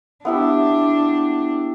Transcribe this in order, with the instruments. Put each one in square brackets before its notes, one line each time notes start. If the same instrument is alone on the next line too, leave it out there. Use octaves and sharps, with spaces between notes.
[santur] B3 E4 G4 [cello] D4